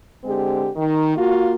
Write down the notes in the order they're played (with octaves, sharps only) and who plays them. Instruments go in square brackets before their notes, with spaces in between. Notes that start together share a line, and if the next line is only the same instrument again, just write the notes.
[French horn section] D3 G#3 C4 G4
D#3
A#3 F4 F#4